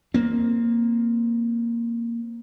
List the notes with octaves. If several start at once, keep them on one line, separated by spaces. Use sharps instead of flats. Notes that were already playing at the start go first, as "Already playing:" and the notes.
A#3 C4